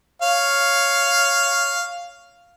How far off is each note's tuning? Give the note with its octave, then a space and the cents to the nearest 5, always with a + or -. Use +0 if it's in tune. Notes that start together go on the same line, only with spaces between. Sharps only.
C#5 +0 F5 +0